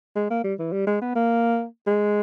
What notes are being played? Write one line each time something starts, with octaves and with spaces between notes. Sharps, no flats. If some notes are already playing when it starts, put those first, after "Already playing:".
G#3
A#3
G3
E3
G3
G#3
B3
A#3
G#3